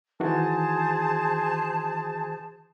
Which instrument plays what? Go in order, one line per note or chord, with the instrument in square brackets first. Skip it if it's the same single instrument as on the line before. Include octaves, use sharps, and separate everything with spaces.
[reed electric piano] D#3 E3 F#4 [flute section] G#4 C5 A5